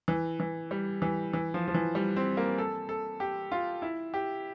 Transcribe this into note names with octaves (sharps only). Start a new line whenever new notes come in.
E3
E3
G3
E3
E3
F3
F3
E3
G3
C4
A#3
A4
A4
G4
F4
E4
G4